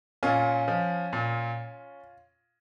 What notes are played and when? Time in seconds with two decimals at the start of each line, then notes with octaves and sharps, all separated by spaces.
0.23 A#2 C#4 F4
0.68 F3
1.13 A#2